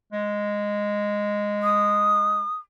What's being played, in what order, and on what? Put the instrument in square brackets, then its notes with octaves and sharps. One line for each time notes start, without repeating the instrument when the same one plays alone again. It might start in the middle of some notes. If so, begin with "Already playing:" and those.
[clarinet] G#3
[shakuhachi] D#6